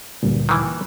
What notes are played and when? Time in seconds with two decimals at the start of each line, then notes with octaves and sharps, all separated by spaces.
0.23 D2 G2 A#2
0.49 D#3 E3